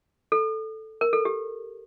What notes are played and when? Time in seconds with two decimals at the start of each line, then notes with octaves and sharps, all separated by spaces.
0.32 A4
1.01 A#4
1.13 A4
1.25 G4